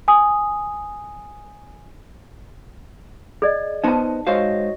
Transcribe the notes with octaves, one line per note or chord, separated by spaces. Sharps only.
G#5 D#6
G#4 D5 D#5
B3 D#4 C5 D#5 A5
G#2 F#4 C5 C#5 D#5 F5